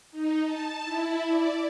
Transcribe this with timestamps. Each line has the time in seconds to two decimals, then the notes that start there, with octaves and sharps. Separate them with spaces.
0.11 D#4
0.44 A5
0.83 E4
1.27 D5